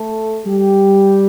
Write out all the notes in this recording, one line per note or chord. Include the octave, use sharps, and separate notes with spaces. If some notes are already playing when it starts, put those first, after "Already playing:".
Already playing: A3 A4
G3 G4